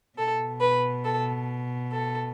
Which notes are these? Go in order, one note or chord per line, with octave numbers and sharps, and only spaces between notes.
B2 A4
B4
A4
A4